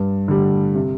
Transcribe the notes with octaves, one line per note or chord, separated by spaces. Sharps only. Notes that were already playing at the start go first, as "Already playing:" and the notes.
Already playing: G2
D3 G3
C3